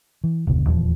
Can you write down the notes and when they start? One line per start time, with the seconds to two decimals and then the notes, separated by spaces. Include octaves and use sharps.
0.24 E3
0.47 F1 D2 A#2 C#3
0.66 D#1 E2 E3 F3